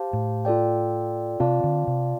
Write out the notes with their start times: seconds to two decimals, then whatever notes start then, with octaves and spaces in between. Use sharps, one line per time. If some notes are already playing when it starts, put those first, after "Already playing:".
Already playing: G4 C5 F5 A5
0.13 A2
0.45 F4 A4 D5 G5
1.40 C3 C4 F4 D5 F5 A5
1.64 D3
1.87 C3